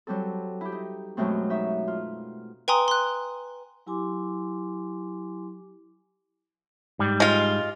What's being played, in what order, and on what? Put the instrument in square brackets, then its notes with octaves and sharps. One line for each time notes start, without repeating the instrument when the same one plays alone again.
[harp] F#3 G3 C4 A4
E4 G4
D#4
F#2 B2 F#3 G#3 A3 C4
D#4 E5 C#6
F4
[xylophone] B4 G5 G#5 A#5 C6 D#6
C6 F#6
[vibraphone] F#3 E4 G4 G#5 C6 D6
[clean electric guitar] G#2 G3
[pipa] G#3 F4